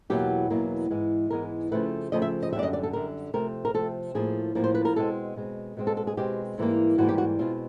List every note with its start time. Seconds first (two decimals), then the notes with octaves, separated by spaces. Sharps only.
0.10 E2 B2 F#3 A#3 G4
0.50 E2 B2 F#3 A#3
0.90 G#2 E3 G#3 B3
1.30 G#2 E3 G#3 B3 A#4
1.71 C#3 F3 A3 C4 B4
2.12 C#3 F3 A3 C4 D#5
2.22 E5
2.43 D#5
2.52 G3 E5
2.55 F#2 D3 D5
2.63 D#5
2.73 D5
2.83 A4
2.93 F#2 D3 G3 A#4
3.34 C3 F3 A3 C4 A#4
3.65 A#4
3.74 C3 F3 A3 C4 A4
4.15 A2 F3 A#3 G#4
4.55 A2 F3 A#3
4.64 C5
4.75 B4
4.85 A#4
4.96 B2 G#3 C4 A4
5.37 B2 G#3 C4
5.77 B2 G#3 C4
5.87 A4
5.97 A4
6.07 G#4
6.17 B2 G#3 C4 G4
6.58 G#2 E3 G3 A#3
6.98 G#2 E3 G3 A#3 F#4
7.08 G4
7.18 F#4
7.39 B2 G#3 C4 F4